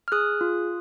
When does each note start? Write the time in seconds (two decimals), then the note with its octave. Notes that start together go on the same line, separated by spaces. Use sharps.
0.08 F6
0.12 G#4 D#6 F#6
0.41 F4